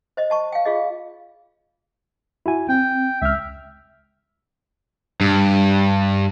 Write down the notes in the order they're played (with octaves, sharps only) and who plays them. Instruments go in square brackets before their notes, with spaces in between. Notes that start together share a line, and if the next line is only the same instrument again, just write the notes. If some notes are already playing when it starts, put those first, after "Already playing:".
[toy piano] C5 D#5
D#5 A5 C#6
F5 G5
F4 G#4 D#5
[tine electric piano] E4 F#4 G#5
[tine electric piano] C4 [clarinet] G5
[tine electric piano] C#2 F6 [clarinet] E5
[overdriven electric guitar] G2